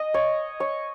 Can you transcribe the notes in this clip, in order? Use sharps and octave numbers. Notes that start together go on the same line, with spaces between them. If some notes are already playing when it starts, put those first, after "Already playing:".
Already playing: D#5
C#5
C#5